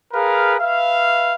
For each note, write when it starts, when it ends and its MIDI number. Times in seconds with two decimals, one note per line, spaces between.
0.13 0.54 68
0.13 0.54 70
0.13 0.54 71
0.13 0.54 77
0.60 1.35 71
0.60 1.35 76
0.60 1.35 77